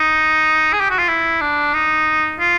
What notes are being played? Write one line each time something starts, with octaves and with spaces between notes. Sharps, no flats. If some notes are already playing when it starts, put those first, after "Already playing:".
Already playing: D#4
G#4
G4
F#4
F4
E4
D4
D#4
F4